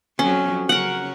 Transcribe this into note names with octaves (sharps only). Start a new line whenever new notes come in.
F2 F3 F#3 C#4
C#3 F#3 C#4 A#4 F#5